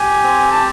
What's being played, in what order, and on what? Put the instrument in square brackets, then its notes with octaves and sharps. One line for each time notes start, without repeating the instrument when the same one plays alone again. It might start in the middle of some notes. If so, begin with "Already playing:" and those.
Already playing: [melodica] G4 [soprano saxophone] G#5
[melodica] C4
[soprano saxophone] A5